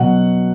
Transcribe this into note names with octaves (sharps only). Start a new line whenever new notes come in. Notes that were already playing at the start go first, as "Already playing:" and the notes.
Already playing: B2 F#3 F#5